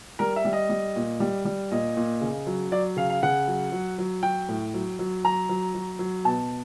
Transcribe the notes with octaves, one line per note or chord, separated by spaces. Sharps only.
G3 A#4
E5
G3
D#5
G3
A#2
G3
G3
A#2 D#5
A#2
C#3
F#3
F#3 D5
C#3 F5
F5
C#3 F#5
F#3
F#3
F#3
F#3 G5
A2
F#3
F#3
F#3 A#5
F#3
F#3
F#3
B2 A5